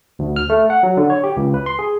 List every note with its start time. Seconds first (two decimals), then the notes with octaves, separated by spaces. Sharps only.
0.19 D2
0.36 F6
0.50 A3
0.70 F#5
0.83 F#3
0.97 D3
1.10 C#5
1.24 G4
1.37 C#2
1.54 B4
1.66 C6
1.79 G#4